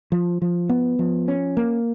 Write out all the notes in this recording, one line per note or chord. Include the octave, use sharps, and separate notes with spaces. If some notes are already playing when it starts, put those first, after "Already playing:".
F3
F3
B3
F3
C#4
A#3